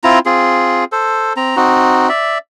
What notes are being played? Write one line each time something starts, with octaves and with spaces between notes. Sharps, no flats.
C4 E4 F4 A#5
C4 F4 G#4
A4 C5
C4 A#5
C4 D#4 F#4
D5 E5